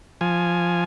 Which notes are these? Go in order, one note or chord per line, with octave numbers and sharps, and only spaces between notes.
F3 G#5